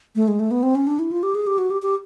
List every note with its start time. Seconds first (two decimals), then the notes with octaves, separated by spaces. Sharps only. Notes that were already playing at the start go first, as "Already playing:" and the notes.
0.16 A3
0.28 G#3
0.40 A3
0.51 B3
0.63 C4
0.75 C#4
0.87 D4
0.99 E4
1.11 F4
1.23 G4
1.35 G#4
1.47 G4
1.58 F#4
1.70 G4
1.82 G4